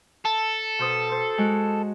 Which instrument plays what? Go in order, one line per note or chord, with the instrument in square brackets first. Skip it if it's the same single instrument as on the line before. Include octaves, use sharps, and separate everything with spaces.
[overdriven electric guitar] A4
[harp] B2 C5 D#6
C5
G#3 F#4